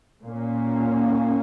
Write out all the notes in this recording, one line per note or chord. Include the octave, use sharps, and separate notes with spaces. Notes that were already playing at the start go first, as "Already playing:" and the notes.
A#2 A#3 C#4